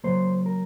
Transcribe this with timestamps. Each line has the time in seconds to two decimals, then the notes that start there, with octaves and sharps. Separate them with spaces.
0.04 C#3 F#3 A#3 C5
0.46 A#4